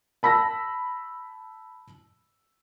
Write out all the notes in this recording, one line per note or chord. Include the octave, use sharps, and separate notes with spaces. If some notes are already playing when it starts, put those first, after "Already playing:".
A5 B5 E6 A#6